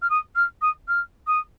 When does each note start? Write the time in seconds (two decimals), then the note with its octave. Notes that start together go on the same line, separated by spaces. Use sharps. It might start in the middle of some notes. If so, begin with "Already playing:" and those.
0.02 F6
0.10 D#6
0.36 F6
0.62 D#6
0.88 F6
1.27 D#6